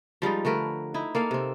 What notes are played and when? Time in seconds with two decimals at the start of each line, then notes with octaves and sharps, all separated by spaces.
0.22 F3 G3 G#3 D#4
0.45 D3 A3 A#4 B4
0.94 D#4 E4
1.15 A#3 A4 F5
1.31 C3 C4